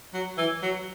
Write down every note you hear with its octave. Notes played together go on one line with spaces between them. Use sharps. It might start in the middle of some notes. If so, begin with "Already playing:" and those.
F#3
E3
F#3